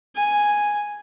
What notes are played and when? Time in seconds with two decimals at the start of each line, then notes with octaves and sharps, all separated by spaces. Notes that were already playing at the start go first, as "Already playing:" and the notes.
0.16 G#5